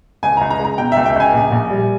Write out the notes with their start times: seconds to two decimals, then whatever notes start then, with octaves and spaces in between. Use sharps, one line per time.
0.23 C#2 G#5
0.37 C#2 A#5
0.50 A#5
0.60 G#3
0.65 A#5
0.78 B2 G5
0.92 C#2 E5
1.06 G5
1.16 C#2 G#5
1.34 A#1
1.52 A#1
1.70 G3